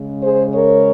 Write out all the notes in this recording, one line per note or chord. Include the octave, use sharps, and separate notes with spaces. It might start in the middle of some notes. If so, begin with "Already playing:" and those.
Already playing: C#3 G#3
G#4 C5
A#4 C#5